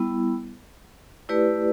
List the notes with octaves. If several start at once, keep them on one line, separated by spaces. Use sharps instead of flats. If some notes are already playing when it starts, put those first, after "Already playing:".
Already playing: G3 B3 E4
A3 E4 G4 B4 D5